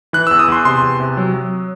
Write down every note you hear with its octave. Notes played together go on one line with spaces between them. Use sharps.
E3 F#6
E6
E2
D#6
E2 C6
C3 C6
E2
C3
F#3
F#3